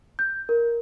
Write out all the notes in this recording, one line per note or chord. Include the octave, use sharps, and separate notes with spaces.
G6
A#4